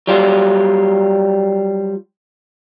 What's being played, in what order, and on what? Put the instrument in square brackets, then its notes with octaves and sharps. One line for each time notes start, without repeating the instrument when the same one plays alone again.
[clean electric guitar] F#3 G3 F4